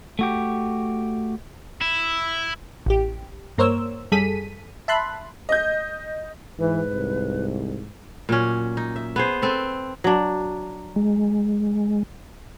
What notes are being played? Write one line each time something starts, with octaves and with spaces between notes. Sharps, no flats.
A3 F#4 G4
E4
A1 G4
G2 A#3 A#4 C5 C#5 E6
F#2 G3 G#4 A4 B6 D#7
E5 A5 B5 C6 F#6
D#5 G6
G#2 E3 B4
C2
A#2 F#3 C#4
D#4
E5
B3 G#4 C5
C4 A4 B4
F#3 D4
G#3